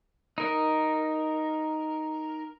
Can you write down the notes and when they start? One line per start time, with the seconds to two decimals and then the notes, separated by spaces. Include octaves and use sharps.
0.38 D#4 A#4